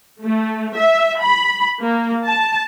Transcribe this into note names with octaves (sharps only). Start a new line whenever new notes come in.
A3
E5
B5
A#3
A5